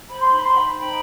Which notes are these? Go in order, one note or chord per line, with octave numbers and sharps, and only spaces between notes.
C5 B5
C6
D#4
B5
C5 C6
G5 B5
C5
D#4 G5 B5